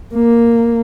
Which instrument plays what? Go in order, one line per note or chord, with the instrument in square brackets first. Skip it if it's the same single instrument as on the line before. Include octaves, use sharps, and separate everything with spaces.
[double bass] A#3